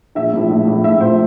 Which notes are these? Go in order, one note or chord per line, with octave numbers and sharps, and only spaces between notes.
A#1 E5
A2 F3
A#1
A2 F3
A#1 E5
A2 F3 C5